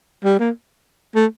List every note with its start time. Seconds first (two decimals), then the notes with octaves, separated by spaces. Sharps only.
0.24 G3
0.39 A#3
1.15 A3